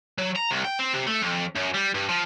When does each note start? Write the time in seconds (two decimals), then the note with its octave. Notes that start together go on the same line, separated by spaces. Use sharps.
0.18 F#3
0.36 A#5
0.51 C2
0.64 G5
0.79 C4
0.94 C3
1.07 A3
1.22 F2
1.55 F#2
1.74 G3
1.95 G2
2.09 F3